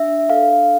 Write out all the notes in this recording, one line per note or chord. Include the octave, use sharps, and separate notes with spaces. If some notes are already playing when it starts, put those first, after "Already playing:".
Already playing: D4 E5
A4 F5